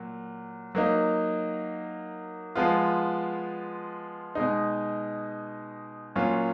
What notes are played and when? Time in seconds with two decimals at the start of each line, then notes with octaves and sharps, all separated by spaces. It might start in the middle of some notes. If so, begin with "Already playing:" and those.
Already playing: A#2 F#3
0.75 F#3 A#3 D#4
2.55 F3 G#3 B3 F4
4.35 B2 G#3 D#4
6.16 A#2 F#3 C#4 F4